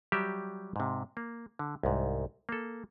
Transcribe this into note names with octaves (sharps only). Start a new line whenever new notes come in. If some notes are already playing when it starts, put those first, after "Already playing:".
F#3 G3 G4 E5 A#5
G#2 C3
A#3
D3
C2 G#2
A#3 A4